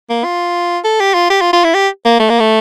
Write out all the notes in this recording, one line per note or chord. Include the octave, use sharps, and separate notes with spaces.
A#3
F4
A4
G4
F4
G4
F4
F4
E4
G4
A#3
A3
A#3
A3